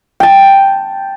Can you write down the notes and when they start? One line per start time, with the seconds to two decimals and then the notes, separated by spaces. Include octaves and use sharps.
0.20 G5 A5